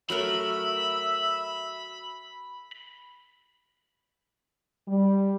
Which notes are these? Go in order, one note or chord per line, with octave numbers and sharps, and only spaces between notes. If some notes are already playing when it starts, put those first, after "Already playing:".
F#3 A3 A#4 E5 B5
G3